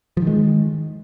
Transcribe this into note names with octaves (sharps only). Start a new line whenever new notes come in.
D#3 F3 G#3